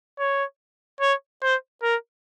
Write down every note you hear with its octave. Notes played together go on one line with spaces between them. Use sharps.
C#5
C#5
C5
A#4